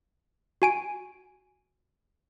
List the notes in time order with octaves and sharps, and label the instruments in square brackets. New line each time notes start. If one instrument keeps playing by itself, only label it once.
[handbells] F#4 G#5 D7